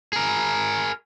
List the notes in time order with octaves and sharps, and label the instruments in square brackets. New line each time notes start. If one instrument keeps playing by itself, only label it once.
[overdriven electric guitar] G#4 A#4